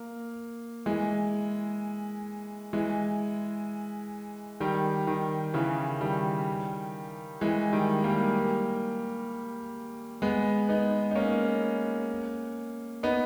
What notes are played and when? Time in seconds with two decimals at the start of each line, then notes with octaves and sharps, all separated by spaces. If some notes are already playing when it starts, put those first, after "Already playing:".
Already playing: A#3
0.86 E3 G#3
2.73 E3 G#3
4.60 D#3 G3
5.07 D#3
5.54 C#3 E3
6.01 D#3 G3
7.41 E3 G#3
7.73 D#3 G3
8.04 G3 A#3
10.22 G#3 B3
10.69 B3 D#4
11.11 D#4
11.15 A#3 C#4
13.03 B3 D#4